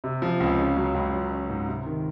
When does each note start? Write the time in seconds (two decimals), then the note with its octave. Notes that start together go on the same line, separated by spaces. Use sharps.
0.04 C3
0.22 F3
0.40 C#2
0.59 C#3
0.77 F#3
0.95 C#2
1.13 F#3
1.32 C#4
1.50 G#2
1.68 C3
1.86 D#3